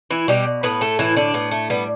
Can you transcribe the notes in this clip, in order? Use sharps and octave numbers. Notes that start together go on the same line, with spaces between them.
E3 E4
B2 G3 G4
A2 B3 B4
A3 A4
A2 E3 E4
D3 D4
A2 B3
A3
G3 B3